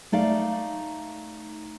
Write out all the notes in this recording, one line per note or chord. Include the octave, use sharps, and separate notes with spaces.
A3 D#4 D5 F5